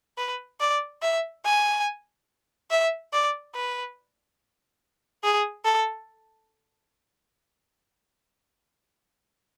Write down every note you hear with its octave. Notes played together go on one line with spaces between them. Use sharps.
B4
D5
E5
G#5
E5
D5
B4
G#4
A4